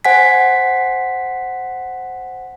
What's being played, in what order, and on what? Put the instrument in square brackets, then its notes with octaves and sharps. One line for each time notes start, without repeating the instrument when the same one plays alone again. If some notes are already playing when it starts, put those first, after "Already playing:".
[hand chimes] C5 F#5 G#5 B6